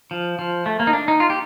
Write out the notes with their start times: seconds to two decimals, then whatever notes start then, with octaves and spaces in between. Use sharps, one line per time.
0.11 F3
0.39 F3
0.66 A3
0.80 A#3
0.87 D#4
0.93 D4
1.08 D#4
1.20 F4
1.30 G4